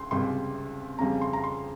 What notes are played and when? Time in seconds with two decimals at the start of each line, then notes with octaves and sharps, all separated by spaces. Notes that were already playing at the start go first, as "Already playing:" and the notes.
Already playing: C#2 C6
0.11 C#2 C3 G3 C6
0.99 F2 C#3 G3 A#5
1.21 C6
1.33 A#5
1.44 C6